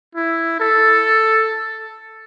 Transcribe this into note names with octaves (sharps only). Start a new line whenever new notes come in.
E4
A4